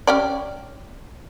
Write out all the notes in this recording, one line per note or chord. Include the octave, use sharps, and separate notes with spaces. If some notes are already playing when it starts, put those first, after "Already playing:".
C#4 G4 D5